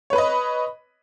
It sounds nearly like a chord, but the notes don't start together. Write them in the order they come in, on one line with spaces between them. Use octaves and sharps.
C#5 B4 B5 D#5